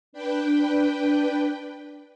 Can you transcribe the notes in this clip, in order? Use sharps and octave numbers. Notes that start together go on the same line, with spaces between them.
D4 B4 G5